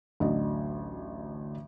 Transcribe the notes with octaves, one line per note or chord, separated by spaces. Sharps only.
A1 D2 F#3 D4 D#5